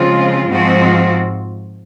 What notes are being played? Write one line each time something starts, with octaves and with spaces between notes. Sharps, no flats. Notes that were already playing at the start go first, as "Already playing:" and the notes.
Already playing: C#3 F3 G#3 C4 F4
G#2 F3 C4 F#4